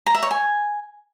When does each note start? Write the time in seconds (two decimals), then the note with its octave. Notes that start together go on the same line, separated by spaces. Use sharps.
0.06 A#5
0.15 E5
0.23 C#5
0.31 G#5